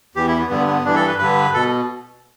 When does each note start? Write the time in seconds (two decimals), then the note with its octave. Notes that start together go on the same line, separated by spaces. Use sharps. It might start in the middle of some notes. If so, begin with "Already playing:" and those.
0.15 E2 E3 G4
0.28 E4
0.39 B3
0.50 G2 D3 B3
0.67 B3
0.84 G2 E3 D4
0.96 A4
1.08 B4
1.19 G2 D3 B4
1.54 B2 A4